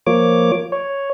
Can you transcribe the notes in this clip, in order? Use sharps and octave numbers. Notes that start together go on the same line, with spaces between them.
F3 A#3 C#5 D6
C#5